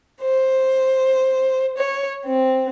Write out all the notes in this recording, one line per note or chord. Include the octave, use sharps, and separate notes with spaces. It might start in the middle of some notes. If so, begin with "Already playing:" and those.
C5
C#5
C4